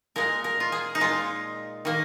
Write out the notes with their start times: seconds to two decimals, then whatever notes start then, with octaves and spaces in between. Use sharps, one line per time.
0.16 A#2 G#3 A#4
0.44 A#4
0.60 F4
0.72 G#4
0.95 D#4
1.00 A#2 G#3 F4
1.85 D#3 A#3